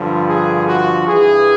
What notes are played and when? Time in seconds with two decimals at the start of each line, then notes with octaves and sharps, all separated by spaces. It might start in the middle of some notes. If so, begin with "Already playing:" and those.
Already playing: G2 D3 F3
0.28 G#4
0.68 F#4
1.08 G2 E3 G#4